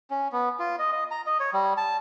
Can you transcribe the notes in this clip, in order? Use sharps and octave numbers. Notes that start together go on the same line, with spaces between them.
C#4
B3
F4
D#5
D#5
A#5
D#5
C#5
G3
A5